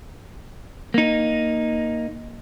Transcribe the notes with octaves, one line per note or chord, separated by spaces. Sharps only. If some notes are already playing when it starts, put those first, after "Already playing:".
A#3 D#4